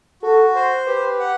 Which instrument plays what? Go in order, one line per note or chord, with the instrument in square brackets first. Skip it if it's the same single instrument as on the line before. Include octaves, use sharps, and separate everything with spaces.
[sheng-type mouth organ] F#4 [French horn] A4
[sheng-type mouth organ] C5
[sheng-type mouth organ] G4 [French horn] B4
[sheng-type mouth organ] F#5